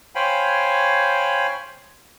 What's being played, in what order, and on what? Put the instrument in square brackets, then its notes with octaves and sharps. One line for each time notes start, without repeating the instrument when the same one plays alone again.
[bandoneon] C5 C#5 F5 G5 G#5 B5